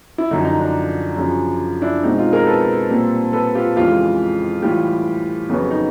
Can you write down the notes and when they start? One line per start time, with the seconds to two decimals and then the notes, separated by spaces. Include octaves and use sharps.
0.18 E4
0.31 F#2 D3 F3 D#4
0.45 D#4
0.59 D4
1.17 F#2 C#3 F3
1.82 D4 E4
2.03 B2 G#3 C4 D#4
2.18 D#4 F4
2.33 G#4 A#4
2.47 A4 B4
2.90 A#2 G3 C4
3.33 A4 B4
3.55 F4 G4
3.76 F2 C#3 E3 G#3 F4 G4
4.62 A2 E3 G3 F4 G4
5.49 F2 C#3 F#3 B3
5.71 D#4